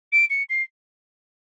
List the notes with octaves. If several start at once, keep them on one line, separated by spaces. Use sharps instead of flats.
D7
C#7
C7